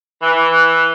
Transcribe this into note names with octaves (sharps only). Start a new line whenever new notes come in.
E3